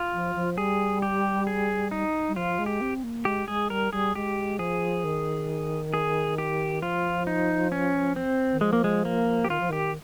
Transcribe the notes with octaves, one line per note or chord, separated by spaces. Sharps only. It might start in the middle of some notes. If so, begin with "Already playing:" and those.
Already playing: F4
F3
F3
G3 G#4
G4
G#4
D#4
G3
F3 F4
G#3
G4
C4
A#3
G#3 G4
G#3 G#4
G3 A#4
G3 G#4
G#3 G4
F3 G#4
D#3
G#4
G4
F3 F4
D#4
C#4
C4
D#3
F3 G#3
A#3
G#3
A#3
G4
D#3 F4
F3
D#3 G4